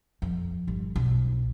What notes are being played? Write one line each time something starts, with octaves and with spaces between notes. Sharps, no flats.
F2
G1
B1